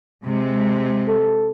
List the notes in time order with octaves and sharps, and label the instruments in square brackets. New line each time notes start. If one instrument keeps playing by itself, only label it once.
[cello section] C3 G#3
[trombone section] A4